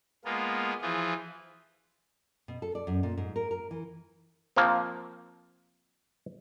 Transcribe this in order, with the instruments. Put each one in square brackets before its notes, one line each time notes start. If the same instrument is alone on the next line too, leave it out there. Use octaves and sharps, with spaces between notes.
[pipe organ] G#3 A#3 B3 F4
E3 F3 F4 G#4
[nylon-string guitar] B2
A4
D5
F#2
A#2
G#2
A#4
A#4
E3
[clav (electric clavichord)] F3 A#3 C4